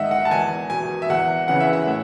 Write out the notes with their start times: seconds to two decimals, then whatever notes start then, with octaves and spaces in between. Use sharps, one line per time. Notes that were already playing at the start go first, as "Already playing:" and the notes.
Already playing: G#2 D#3 D#5 E5 F#5
0.11 F#5
0.25 A5
0.31 E2 G#5
0.70 B2 G#5
1.02 E5
1.09 E2 F#5
1.48 C#3 E3 F#5
1.60 E5
1.73 F#5
1.87 A2 E5